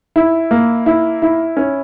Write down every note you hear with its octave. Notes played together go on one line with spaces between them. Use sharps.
E4
A#3
E4
E4
C#4